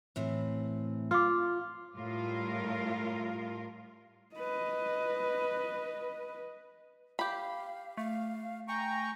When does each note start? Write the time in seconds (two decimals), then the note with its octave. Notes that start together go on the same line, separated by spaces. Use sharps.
0.16 A2 E3 C4
1.11 F4 D6 F6
1.96 A2 G3 F4 A#4 F5
4.36 B4 D#5
7.19 G4 F5 B5
7.97 A3 F5
8.68 G5 G#5 A#5 C#6